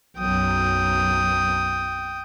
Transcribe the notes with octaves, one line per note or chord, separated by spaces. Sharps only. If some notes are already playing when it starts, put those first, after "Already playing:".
B1 F#2 G5 D#6